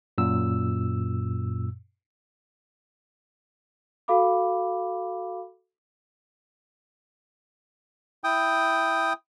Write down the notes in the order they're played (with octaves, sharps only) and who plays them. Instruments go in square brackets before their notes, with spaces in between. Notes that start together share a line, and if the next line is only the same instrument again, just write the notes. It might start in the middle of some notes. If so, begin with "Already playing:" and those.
[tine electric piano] F#2 A#2 E6
[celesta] F#4 A4 F5 B5 D6
[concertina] E4 G5 D#6